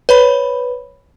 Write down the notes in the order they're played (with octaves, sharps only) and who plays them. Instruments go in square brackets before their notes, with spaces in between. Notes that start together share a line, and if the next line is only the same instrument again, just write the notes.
[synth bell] B4 C#5 B5